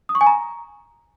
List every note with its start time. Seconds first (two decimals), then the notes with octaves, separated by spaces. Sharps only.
0.09 D#6
0.15 C#6
0.21 G#5
0.27 A#5